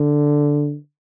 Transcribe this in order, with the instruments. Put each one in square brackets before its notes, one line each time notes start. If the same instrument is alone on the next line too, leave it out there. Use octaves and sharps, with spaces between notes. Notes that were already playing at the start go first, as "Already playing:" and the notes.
Already playing: [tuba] D3